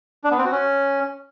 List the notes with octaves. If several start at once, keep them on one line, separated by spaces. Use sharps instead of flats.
D4
B3
C4
F#4
C#4